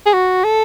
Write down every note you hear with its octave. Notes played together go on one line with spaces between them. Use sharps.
G#4
F#4
A4